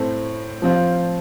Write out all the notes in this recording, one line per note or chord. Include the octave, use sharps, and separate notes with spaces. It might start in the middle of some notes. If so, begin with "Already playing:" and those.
Already playing: A2 A3 C4
F3 C4 F4